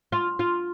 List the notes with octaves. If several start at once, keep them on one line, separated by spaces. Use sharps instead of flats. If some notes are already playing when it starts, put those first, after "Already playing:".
F4
F4